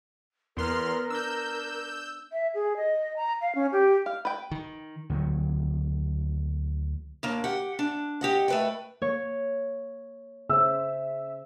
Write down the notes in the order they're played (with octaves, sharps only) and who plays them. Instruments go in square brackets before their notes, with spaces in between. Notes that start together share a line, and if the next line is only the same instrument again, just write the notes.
[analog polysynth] E2 C6 F6 [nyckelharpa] B3 [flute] A#4
[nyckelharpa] D4 [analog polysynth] E6 G6
[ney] E5
G#4
D#5
A#5
F5
C#4
G4
[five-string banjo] F5
B4 G5
[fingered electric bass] D#3
[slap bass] D2 D#3 F#3
[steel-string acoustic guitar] D#2 A#3 D4
G4 F#5
D4
G4 D#5 F#5
A3 B4 G5
[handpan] A#3 [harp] C#5
[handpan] C#3 C5 [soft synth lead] E5 [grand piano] E6